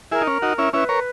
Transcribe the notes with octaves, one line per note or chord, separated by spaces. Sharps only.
E4 G#4 A#4
D#4
C#4
D#4 F#4
C#4 E4
C#4 E4 B4
A#4 C#5